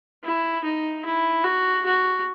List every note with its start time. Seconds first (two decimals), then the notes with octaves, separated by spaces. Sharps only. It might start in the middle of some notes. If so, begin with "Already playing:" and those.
0.24 E4
0.65 D#4
1.05 E4
1.44 F#4
1.85 F#4